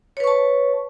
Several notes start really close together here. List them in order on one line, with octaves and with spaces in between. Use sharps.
C#5 B4 C#6 A5